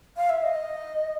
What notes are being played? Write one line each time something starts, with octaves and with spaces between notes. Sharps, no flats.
F5
E5
D#5